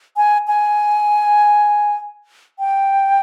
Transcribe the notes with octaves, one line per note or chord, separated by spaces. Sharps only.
G#5
G#5
G5